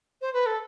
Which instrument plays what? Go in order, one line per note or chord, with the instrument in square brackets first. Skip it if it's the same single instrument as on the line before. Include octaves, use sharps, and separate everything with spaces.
[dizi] C5
B4
A4